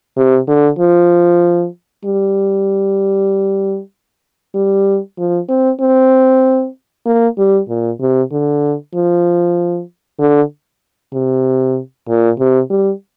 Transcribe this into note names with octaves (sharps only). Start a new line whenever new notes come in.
C3
D3
F3
G3
G3
F3
C4
C4
A#3
G3
A#2
C3
D3
F3
D3
C3
A#2
C3
G3